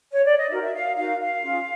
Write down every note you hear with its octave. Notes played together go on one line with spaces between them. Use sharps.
C#5
D5
D#5
D#4 F#4 A#4 E5
E5
F5
D#4 F#4 A#4 F5
F5
C#4 F4 G#4